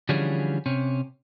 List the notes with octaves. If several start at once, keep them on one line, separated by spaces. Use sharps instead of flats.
D3 E3 F3 G3 C#4 G#4
C3 C#4